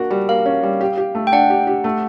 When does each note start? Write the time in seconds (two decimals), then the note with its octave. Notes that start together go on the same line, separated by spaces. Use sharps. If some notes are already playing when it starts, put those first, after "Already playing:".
Already playing: A#3 D4 F#4
0.11 G3
0.29 A#3 F5
0.46 C#4
0.63 G3
0.81 G4
0.98 G4
1.15 A3
1.27 G5
1.32 D4 F#5
1.50 G4
1.67 G4
1.84 A3